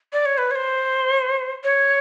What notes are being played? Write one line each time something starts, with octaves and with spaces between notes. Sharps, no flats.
D5
C#5
B4
C#5
C5
C#5